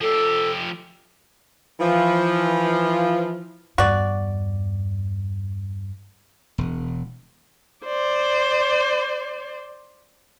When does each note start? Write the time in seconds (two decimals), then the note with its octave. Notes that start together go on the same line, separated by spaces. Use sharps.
0.01 F3 G4 A4
1.80 E3 F3
3.78 E2 G2 F#4 D5
6.58 E1
7.86 C5 D5